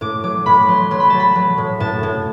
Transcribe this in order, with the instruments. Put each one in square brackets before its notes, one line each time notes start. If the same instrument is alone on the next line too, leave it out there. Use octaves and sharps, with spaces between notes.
[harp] A2 D6
F#3 D6
A2 B5
F#3 C6
F#3 C6
B5
F#3 A5
B5
F#3
A2
A2 A5
A2